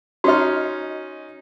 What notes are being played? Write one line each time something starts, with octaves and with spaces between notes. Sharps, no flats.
C#4 D#4 F#4 D#5 F6